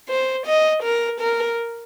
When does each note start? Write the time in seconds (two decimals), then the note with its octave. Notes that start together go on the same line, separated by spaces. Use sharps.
0.09 C5
0.46 D#5
0.83 A#4
1.20 A#4